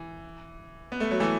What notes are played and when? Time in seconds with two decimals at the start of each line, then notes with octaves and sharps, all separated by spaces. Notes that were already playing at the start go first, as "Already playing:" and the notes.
Already playing: E3
0.92 B3
1.00 A3
1.11 F#3
1.20 E3 A3